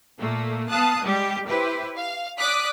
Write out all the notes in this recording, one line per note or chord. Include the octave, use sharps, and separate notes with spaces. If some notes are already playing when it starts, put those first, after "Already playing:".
A#2 A3 A#3
B3 F5 A5 D#6 F#6
G3 G#3 G4
E4 G4 B4 C5
F5
D5 D6 D#6 F#6 B6